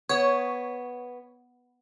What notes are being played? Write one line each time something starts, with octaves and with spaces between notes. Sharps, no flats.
B3 C#5